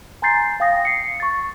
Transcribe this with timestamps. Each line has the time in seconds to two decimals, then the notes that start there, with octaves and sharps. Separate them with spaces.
0.22 G#5 A#5 C6 G6 A6 C7
0.60 F5 G5 D#6 A#6
0.85 C7 C#7
1.20 C#6 A6